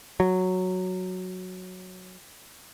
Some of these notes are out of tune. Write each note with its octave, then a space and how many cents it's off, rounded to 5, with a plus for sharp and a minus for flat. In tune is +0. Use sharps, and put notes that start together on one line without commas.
F#3 -5